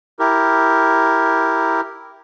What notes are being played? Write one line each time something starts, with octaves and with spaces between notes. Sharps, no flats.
E4 G4 A#4